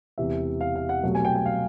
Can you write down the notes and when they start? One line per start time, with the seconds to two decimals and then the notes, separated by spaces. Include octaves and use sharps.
0.18 E1 E2 C3 E3 E5
0.61 F5
0.76 F5
0.89 F#5
1.03 C2 B2 F#3 A3
1.15 G#5
1.25 G5
1.35 G5
1.46 F5